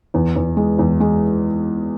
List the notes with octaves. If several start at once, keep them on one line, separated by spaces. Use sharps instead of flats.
E2
E2
G#3
E2
G#3